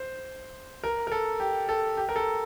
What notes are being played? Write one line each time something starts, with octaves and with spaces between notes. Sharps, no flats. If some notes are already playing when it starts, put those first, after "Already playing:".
Already playing: C5
A#4
A#4
A4
G4
A4
G4
A#4
A4